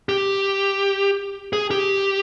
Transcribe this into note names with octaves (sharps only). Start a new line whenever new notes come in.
G4
G#4
G4